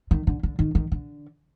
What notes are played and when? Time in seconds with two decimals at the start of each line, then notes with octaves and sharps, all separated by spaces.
0.11 D#3
0.27 D3
0.43 D3
0.59 D#3
0.75 D#3
0.92 D3